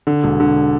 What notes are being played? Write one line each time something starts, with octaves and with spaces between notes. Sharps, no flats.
D3
E1
D3